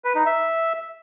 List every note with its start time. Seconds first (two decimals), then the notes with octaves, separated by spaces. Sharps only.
0.04 B4
0.15 D#4
0.26 E5